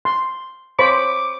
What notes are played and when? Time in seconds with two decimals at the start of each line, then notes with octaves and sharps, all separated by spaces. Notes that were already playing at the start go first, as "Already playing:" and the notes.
0.05 C6
0.79 C5 C#5 B5 D6